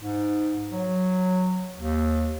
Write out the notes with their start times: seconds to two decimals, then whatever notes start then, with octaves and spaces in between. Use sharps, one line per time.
0.02 G#2
0.71 F#3
1.76 D#2